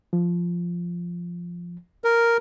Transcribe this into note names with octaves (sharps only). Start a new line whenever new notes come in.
F3
A#4